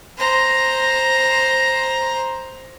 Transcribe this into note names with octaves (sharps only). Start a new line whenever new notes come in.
C5 A#5